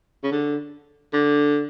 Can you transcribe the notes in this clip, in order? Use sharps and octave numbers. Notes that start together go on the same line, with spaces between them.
C#3
D3
D3